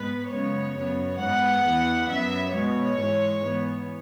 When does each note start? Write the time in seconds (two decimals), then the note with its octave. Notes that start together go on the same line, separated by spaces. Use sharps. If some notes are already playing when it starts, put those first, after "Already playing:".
Already playing: G#2 G#3 B3 B4
0.29 F#2 C#3 G#3 B3 C#5
0.74 F#2 F#3 B3
1.18 G#2 G#3 B3 F#5
1.63 E2 E3 B3
2.08 F#2 F#3 B3 E5
2.53 B2 G#3 B3 C#5
2.97 G#2 E3 G#3
3.42 G#2 E3 B3